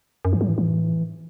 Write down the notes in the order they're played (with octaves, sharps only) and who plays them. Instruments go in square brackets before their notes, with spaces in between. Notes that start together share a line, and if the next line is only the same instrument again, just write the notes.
[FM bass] F#2
[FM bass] G#2 [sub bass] E3
[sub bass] F#3
[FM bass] A2 [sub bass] E3
[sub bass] E3